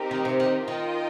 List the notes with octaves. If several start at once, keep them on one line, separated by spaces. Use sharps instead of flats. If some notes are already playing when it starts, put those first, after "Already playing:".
Already playing: C4 D#4 G4 A#4
D#3
C3
D#3
D#3 F4 A#4 D#5 G5